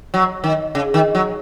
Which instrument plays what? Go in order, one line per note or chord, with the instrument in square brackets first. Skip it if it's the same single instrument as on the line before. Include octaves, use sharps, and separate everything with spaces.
[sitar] F#3
D#3
C#3
D#3
F#3